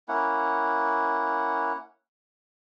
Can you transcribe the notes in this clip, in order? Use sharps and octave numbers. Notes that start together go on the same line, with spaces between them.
A#3 C#4 E4 F#5